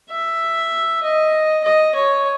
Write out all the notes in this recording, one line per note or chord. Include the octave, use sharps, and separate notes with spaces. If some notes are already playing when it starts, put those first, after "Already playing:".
E5
D#5
D#5
C#5